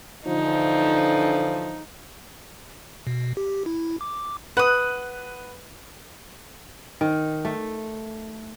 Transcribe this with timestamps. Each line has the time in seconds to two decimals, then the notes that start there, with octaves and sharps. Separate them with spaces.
0.26 D3 E3 F3 D#4
3.07 B2
3.37 G4
3.66 E4
4.01 D6
4.57 B4 F#5 D#6
7.01 D#3
7.45 A3